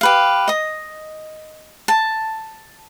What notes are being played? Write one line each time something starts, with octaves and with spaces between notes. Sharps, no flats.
G4 B4 F5
D#5 D#6
A5